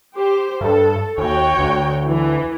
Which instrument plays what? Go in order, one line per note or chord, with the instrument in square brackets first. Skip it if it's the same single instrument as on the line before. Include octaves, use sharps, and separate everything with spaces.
[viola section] G4 C5
[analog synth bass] G2 [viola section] A4
[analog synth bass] D#2 [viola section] F#4 C#5 G5
[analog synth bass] D2
[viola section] E3